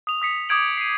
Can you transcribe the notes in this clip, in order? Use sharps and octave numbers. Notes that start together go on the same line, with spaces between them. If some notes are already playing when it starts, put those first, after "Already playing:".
D#6 F7
D#6 B6 C#7
D6 D#6 G6 G#6 D7 F#7
C7 D#7